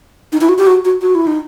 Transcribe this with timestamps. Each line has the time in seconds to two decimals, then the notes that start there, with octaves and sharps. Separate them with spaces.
0.33 D#4
0.41 E4
0.49 F#4
0.58 G4
0.67 F#4
0.85 F#4
1.02 F#4
1.15 E4
1.27 D#4